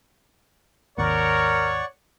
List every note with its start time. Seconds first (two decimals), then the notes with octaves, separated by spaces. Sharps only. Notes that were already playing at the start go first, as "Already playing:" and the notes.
0.98 G#1 D#2 A#4 C#5 D5 F#5 C#6